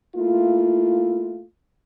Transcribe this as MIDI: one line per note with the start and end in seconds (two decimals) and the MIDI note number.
0.15 1.44 57
0.15 1.44 58
0.15 1.44 64
0.15 1.44 65